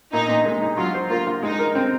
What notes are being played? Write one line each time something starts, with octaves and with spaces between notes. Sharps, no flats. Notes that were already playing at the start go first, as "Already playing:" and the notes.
A#2 D#4
A#2
G#3
D#4
F#3 F4
C5
A#3 F4
F4
G#3 D#4
A#4
C4